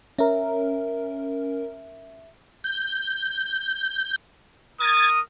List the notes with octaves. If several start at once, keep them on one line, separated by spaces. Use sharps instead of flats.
C#4 A#4 E5
G6
A#4 D#6 G#6 A6